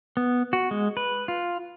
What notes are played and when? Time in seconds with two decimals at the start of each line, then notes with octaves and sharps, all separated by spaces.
0.17 B3
0.53 F#4
0.71 G#3
0.97 B4
1.28 F4